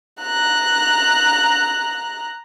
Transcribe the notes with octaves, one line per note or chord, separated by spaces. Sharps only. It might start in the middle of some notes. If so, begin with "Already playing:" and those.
A#5 F#6